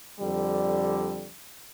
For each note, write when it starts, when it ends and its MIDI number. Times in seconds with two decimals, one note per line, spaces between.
0.20 1.29 41
0.20 1.29 50
0.20 1.29 55